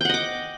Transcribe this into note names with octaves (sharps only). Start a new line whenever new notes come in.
D#5 F#5 G5 D6